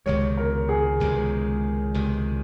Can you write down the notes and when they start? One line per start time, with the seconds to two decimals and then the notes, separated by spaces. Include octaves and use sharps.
0.06 C#2 C3 D#3 G#3 C#5
0.37 A#4
0.69 G#4
1.00 C#2 C3 D#3 G#3
1.94 C#2 C3 D#3 G#3